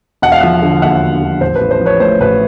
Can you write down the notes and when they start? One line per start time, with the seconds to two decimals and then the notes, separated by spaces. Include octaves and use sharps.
0.22 E1 F#5
0.32 F5
0.40 F3 E5 F#5
0.62 D3
0.82 D#2 E5 F#5
1.02 E1
1.21 F3
1.41 A1 C5
1.56 B4
1.61 A1
1.71 C5
1.81 F3
1.86 B4 C#5
2.00 A2 C5
2.21 A1 B4